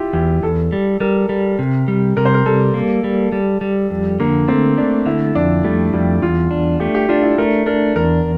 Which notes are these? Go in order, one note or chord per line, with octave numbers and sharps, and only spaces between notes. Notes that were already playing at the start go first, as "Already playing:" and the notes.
Already playing: E4 F4 G4
E2 G4
E2 A4
G3
G3 A#4
G3
C3
G3
C3 A#4
C5
A#4
G3 A4
A#3
G3
G3
G3
F2
D3 A#3
A3 C4
A3 D4
D3 E4
F2 D4
G3 A3
F2 G3
E2 F4
D4
A3 G4
G4
D4 F4
E4
A3 A#4
D4 A#4
E2 A#4